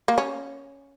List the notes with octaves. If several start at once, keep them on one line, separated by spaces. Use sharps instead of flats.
A#3
C#4